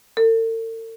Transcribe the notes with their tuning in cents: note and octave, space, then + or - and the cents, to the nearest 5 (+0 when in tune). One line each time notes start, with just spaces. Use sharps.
A4 +45